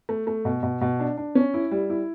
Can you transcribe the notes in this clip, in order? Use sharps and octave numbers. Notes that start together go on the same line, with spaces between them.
A3
A3
B2
B2
B2
D4
D4
C#4
E4
G3
E4